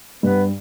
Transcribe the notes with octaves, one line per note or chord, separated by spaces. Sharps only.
G2 B3 B4